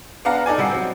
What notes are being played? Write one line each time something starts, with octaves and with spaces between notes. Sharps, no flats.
B3 D4 F5 F#5 A#5
D#4 A4 D5 G#5
C3 G3 F#4 C7
F#3 C4